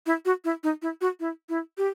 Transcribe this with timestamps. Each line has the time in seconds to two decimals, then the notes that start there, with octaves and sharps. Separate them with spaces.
0.06 E4
0.25 F#4
0.45 E4
0.63 D#4
0.82 E4
1.01 F#4
1.20 E4
1.49 E4
1.78 G4